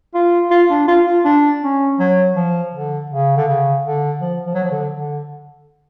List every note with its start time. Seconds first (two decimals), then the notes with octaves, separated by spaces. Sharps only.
0.14 F4
0.51 F4
0.70 D4
0.88 F4
1.06 F4
1.25 D4
1.63 C#4
1.99 F#3
2.36 F3
2.74 D3
3.10 C#3
3.37 D3
3.48 C#3
3.85 D3
4.21 F3
4.47 F3
4.54 F#3
4.63 F3
4.71 D3
4.95 D3